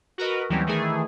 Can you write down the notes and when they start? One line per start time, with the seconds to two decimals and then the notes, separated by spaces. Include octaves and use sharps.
0.18 F#4 A#4 B4 D#5
0.49 D#2 E3 F#3 G3 C4 C#4
0.66 D#3 E3 A3 G#4